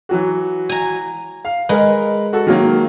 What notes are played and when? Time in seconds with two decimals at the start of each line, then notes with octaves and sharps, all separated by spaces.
0.09 E3 F#3 F#4
0.69 G#5 A#5
1.45 F5
1.69 G#3 A#4 B4
2.33 F#4 A4
2.47 D#3 F#3 A#3